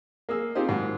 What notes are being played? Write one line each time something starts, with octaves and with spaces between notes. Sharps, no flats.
A#3 G#4 E6
C4 D#4 F4 G4 G#4 C5
G#2 D#3 F#3